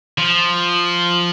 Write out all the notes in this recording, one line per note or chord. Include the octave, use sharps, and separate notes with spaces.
F3